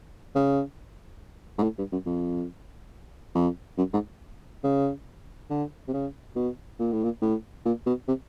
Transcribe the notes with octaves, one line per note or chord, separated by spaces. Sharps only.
C#3
G#2
A2
G2
F#2
F2
F2
F#2
G#2
C#3
D3
C3
C#3
B2
A#2
A2
A#2
A2
A#2
B2
C3